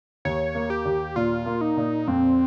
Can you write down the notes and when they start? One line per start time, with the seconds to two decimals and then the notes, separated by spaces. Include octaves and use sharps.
0.25 D#2 C#5
0.55 A#3
0.70 G4
0.85 D#2
1.16 A#2 F4
1.46 A#3
1.61 D#4
1.77 A#2
2.07 F2 C4